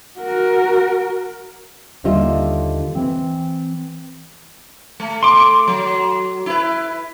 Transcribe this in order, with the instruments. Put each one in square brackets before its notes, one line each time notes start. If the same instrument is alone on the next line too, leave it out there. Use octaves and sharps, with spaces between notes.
[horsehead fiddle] F#4 A#4
[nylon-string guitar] D#2 D3 G3 F4 D#5 E5
E3 C4
[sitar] A3
[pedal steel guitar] C6 D6
[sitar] F#3
E4 B4